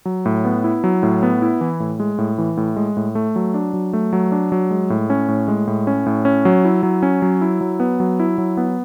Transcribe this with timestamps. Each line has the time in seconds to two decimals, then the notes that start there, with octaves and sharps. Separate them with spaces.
0.05 F#3
0.26 A2
0.45 B3
0.64 E4
0.84 F#3
1.03 A2
1.23 B3
1.42 E4
1.61 E3
1.80 A2
2.00 G#3
2.18 A2
2.38 E3
2.57 A2
2.76 G#3
2.97 A2
3.15 A3
3.36 F#3
3.54 D4
3.74 F#3
3.93 A3
4.13 F#3
4.32 D4
4.52 F#3
4.71 G#3
4.90 A2
5.10 C#4
5.28 A2
5.48 G#3
5.67 A2
5.87 C#4
6.06 A2
6.25 C#4
6.45 F#3
6.65 E4
6.83 F#3
7.03 C#4
7.22 F#3
7.41 E4
7.61 F#3
7.80 B3
8.00 F#3
8.20 E4
8.38 F#3
8.57 B3